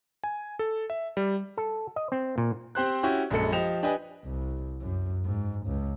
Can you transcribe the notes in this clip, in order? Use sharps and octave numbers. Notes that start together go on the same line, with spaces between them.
G#5
A4
E5
G3
A4
D#5
C4
A#2
C4 G4 C5 F#6
C#4 E4 F#4 G4
A#1 F#2 G#3 A4 C#7
F3 G4 D#5 E7 F7
D4 G4 B4 D#5 G#5
C2
F#2
G#2
C#2